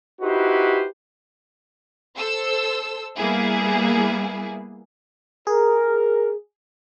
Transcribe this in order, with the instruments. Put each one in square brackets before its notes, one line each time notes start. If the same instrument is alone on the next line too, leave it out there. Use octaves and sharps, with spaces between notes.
[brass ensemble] D#4 E4 F#4 G4 B4 C5
[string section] A4 C5 E6
G3 A#3 B3 E4 G#4
[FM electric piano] G#4 [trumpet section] A#4